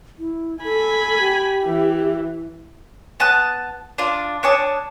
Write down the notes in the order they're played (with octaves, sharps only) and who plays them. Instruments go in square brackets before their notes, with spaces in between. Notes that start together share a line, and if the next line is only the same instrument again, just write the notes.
[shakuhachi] E4
[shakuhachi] A4 [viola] G#5 B5
[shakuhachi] G4
[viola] E3
[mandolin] B3 A5 D#6 F#6
D4 F4
D4 C#5 A5 D#6